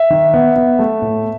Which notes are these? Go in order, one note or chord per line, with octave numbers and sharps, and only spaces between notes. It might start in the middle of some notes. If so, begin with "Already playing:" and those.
Already playing: E5
D#3
B3
B3
A3
A2